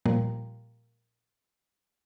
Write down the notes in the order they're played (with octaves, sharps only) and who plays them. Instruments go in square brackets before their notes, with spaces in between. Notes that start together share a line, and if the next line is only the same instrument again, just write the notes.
[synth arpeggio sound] A#2 F3 G3 A#3